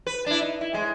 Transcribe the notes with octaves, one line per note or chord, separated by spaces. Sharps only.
B4
D4 E4
D#4
E4
A2 G#3